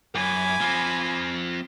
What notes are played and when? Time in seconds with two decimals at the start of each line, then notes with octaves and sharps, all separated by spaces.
0.15 F#2 G#5 B5 D6
0.61 F3 C4